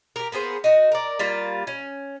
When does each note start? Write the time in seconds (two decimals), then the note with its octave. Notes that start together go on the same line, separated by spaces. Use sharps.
0.16 G4 A#4
0.32 A#3 B3 G#4 C5
0.64 D#4 F#4
0.92 A#4 D5
1.19 G3 A#3 F4
1.67 C#4